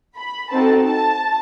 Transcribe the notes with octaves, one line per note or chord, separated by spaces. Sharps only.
B5
C4 D#4 F#4 A4 A5
A5